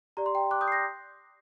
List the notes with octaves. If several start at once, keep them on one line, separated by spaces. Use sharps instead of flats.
G4 D5 A#5
C6
G5 A#5
D6 F#6
D#6 G6
C7
G6 A#6